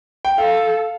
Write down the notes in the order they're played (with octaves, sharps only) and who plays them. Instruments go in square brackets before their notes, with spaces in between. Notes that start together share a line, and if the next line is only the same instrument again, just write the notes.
[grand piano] G5
[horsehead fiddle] A4 [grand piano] F5